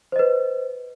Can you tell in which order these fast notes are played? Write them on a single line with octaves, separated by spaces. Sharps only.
C5 D#5 B4